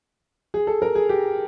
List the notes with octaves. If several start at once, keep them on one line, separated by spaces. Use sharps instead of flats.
G#4
A4
A#4
G#4
G4